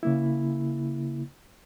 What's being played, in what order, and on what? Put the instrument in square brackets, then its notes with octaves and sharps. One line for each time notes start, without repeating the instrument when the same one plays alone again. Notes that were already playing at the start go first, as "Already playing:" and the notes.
[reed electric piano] C#3 A#3 E4